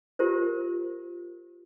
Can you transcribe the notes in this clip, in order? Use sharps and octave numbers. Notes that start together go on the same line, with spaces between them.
F4 G4 A#4 C5